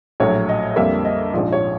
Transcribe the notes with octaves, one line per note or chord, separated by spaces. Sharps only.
A#1 A2 F#3 C#5
D#5
F2 D3 G3 A#3 E5
D#5
A#1 G#2 F3 D5
C#5